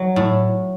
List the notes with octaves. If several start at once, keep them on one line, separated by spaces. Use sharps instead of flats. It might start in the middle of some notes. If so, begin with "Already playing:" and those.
Already playing: F#3
A2